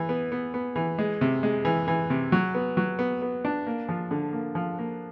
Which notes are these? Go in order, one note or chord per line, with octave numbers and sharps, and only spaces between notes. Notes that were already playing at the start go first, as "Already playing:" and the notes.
Already playing: E3
B3
B3
B3
E3
G#3
C3
G#3
E3
E3
C3
F#3
B3
F#3
B3
B3
D4
A#3
F3
D3
A#3
F3
A#3